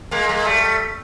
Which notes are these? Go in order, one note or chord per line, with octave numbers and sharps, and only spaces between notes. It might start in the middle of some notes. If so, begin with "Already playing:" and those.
G#3 A#3
G#3 A#3
G3 A3